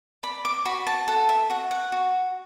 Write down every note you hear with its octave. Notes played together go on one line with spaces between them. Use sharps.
D5 B5
D6
F#4 B5
A5
A4 F#5
E5
F#4 F#5
F#5
F#4